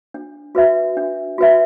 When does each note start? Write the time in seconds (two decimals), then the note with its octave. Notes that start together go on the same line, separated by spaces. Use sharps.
0.14 D4
0.55 F#4 B4 E5
0.97 D4
1.38 F#4 B4 E5